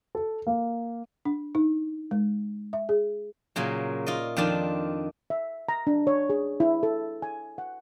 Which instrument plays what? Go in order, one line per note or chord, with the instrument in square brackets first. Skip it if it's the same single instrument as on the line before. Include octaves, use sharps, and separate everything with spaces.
[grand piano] A4
A#3
[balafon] D4
D#4
G#3
E5
G#4
[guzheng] A#2 C#3 F#3 A#3
F4 D5 D#5
F2 D#3 D4 F4 D5 A5
[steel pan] E5
A#5
D4
C#5
G#4
E4
A4
G#5
F#5